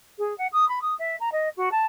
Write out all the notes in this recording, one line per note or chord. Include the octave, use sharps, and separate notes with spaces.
G#4
F#5
D#6
B5
D#6
E5
A#5
D#5
F#4
A5